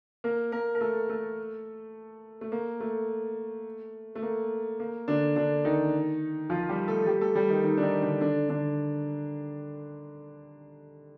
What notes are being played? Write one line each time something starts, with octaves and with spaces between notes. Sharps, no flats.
A#3 A#4
A#3 A#4
A#4
A3 A4
A3 A4
A3
A#3
A3
A3
A#3
A#3
D3 D4
D3 D4
D#3 D#4
F3 F4
G3 G4
A3 A4
G3 G4
A3 A4
G3 G4
D#3 D#4
D#3 D#4
D4
D#3 D#4
D3 D4
D3 D4
D3 D4